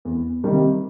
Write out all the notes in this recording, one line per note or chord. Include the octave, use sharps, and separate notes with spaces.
E2
C3 D#3 G3 A#3